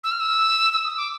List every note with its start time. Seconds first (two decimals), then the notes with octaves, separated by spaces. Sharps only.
0.04 E6
0.12 F6
0.20 E6
0.73 E6
0.85 D#6
0.97 D6